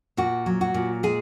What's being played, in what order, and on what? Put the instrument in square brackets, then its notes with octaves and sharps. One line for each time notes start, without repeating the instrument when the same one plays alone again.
[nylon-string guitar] A#2 F#4
F#3
F#4
A#2
G#3 G#4